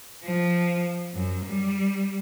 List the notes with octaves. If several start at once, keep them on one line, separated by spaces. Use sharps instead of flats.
F3
F#2
G3